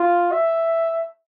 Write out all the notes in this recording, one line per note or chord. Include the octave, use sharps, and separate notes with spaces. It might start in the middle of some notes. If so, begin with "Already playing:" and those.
Already playing: F4
E5